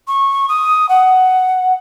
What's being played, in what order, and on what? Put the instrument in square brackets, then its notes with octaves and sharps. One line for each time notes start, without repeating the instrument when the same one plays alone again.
[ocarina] C#6
D#6
F#5